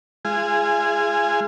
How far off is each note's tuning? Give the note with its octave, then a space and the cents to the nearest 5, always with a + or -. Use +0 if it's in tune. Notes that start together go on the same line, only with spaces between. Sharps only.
G#3 +0 F4 -45 G#4 -10